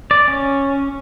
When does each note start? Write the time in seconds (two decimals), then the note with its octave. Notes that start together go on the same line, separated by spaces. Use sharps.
0.11 D5
0.28 C#4